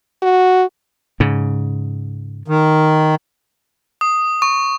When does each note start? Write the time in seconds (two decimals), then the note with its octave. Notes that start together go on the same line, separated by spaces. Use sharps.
0.22 F#4
1.20 G#2 C#3
2.48 D#3
4.01 D#6
4.42 C#6